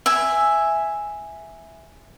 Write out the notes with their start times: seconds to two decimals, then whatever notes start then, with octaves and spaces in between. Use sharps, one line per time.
0.06 E5 G#5